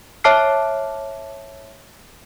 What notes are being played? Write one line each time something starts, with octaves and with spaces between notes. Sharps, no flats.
C#5 E5 A5 D6 F6 C7